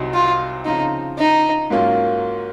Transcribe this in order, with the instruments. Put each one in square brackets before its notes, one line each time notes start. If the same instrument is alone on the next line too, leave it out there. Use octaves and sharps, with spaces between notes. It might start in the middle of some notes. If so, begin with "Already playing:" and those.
Already playing: [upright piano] C2 C3 F#3 C4 D#4
[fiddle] F4
[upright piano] C#3 F3 C4 [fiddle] D#4
[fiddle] D#4
[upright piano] G#2 F#3 A#3 C#4 F4